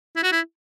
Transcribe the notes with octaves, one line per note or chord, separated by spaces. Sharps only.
E4
F#4
E4